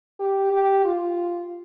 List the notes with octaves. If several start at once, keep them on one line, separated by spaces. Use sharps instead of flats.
G4
G4
F4